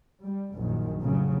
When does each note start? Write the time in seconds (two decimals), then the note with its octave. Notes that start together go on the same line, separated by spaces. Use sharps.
0.22 G3
0.55 A#1 F#2 D#3
1.02 F1 A2 C#3 F#3